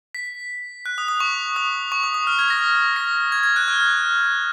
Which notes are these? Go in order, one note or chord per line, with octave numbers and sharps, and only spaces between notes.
B6
F#6
D#6
D#6
C#6
D#6
C#6
D#6
D#6
F6
G#6
A#6
A#6
G#6
G#6
F#6
F6